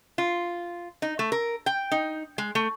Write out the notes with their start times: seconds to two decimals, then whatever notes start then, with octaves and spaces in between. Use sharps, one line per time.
0.18 F4
1.02 D#4
1.19 A3
1.32 A#4
1.66 G5
1.92 D#4
2.38 G#3
2.55 A3